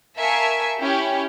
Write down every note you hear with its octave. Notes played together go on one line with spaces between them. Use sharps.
A#4 E5 F5 G#5 A5 C#6
C#4 E4 G4